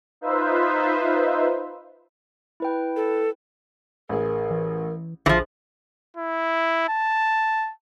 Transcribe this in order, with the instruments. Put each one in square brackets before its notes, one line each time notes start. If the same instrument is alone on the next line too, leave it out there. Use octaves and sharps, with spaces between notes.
[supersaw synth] D#4 F4 B4 C5 E5
[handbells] E4 B4 G5
[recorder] A4
[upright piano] A1 G#4 [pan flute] A#4
[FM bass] E3
[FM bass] A#1 [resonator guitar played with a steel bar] E3 F3 [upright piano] G#4 C5
[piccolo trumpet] E4
A5